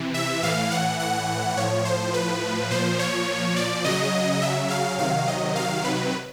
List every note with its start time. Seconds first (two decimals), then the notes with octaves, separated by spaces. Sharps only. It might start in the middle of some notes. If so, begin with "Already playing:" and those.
Already playing: C3 E3
0.14 E5
0.43 A2 E3 F5
0.71 F#5
0.99 F#5
1.57 A2 F3 C#5
1.85 C5
2.14 B4
2.71 A#2 F3 C5
2.99 C#5
3.56 D5
3.84 C#3 F#3 D#5
4.42 E5
4.70 F5
4.98 C3 D#3 F#3 F5
5.27 D#5
5.55 F5
5.84 B4